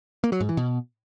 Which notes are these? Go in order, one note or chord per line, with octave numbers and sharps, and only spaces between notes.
A#3
F#3
G#2
E3
B2